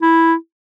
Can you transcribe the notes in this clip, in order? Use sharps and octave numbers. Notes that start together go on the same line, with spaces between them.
E4